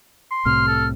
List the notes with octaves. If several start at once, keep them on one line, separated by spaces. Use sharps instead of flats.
C6
C2 A2 C3 F6
A4